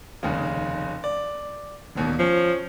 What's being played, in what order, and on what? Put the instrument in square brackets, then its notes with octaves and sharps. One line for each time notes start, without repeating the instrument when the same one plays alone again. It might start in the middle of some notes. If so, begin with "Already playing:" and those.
[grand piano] F1 D#2 C#3
D5
E1 D#2 B2
[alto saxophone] F3 [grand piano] C#4